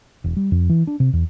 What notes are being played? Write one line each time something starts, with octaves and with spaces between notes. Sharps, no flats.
E1
G3
F2
E3
D4
C3
E2